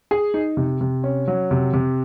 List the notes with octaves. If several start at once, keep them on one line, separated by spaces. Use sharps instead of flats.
G#4
D#4
C3
C3
C#4
F#3
C3
C3